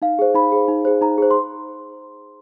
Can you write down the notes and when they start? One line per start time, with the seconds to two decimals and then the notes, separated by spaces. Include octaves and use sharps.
0.02 D#4 F5
0.19 G#4 C5
0.35 D#4 B5
0.52 G#4 C5
0.68 D#4
0.85 G#4 C5
1.01 D#4 A#5
1.18 G#4 C5
1.31 C6